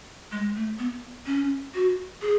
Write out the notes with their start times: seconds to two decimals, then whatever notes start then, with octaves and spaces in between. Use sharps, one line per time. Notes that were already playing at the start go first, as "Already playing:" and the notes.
0.32 G#3
0.56 A3
0.79 B3
1.26 C#4
1.74 F#4
2.22 G#4